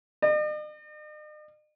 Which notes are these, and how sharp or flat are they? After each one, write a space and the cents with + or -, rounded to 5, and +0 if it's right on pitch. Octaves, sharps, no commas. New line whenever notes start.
D#5 -45